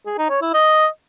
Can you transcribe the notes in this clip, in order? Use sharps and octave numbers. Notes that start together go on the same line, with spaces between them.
G#4
D#4
C#5
E4
D#5